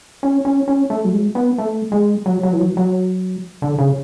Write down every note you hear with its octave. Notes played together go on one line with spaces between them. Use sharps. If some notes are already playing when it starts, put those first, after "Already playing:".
C#4
C#4
C#4
A3
F#3
G#3
B3
A3
G#3
F#3
F#3
E3
F#3
F#3
D3
C#3